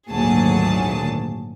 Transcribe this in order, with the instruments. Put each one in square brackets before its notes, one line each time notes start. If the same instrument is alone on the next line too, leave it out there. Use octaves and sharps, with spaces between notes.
[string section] G#1 D2 A#2 F#3 G#4 A5